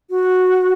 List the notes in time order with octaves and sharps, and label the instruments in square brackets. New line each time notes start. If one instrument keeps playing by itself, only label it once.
[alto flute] F#4